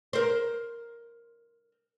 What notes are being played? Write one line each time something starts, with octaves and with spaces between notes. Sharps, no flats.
A#4 C5